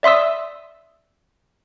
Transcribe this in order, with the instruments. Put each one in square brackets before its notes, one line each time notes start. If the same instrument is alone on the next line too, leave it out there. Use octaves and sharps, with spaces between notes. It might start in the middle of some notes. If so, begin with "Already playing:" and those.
[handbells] D5 E5 C6 D#6 E6